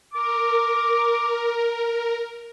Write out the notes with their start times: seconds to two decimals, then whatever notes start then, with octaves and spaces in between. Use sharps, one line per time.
0.13 A#4 D6